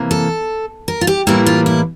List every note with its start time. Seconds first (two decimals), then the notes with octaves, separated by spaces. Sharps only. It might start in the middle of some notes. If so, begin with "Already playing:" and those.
Already playing: C3 E3 A#3
0.11 A4
0.88 A#4
1.01 F4
1.07 G4
1.27 A2 E3 G3 A#3 E4
1.46 F4
1.66 E4